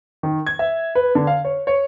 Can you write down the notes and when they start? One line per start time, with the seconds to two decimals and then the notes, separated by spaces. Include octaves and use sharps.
0.23 D#3
0.47 G#6
0.59 E5
0.95 B4
1.15 D3
1.27 F5
1.45 C#5
1.67 C#5